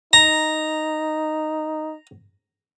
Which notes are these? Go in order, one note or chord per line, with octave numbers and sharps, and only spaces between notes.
D#4 A#5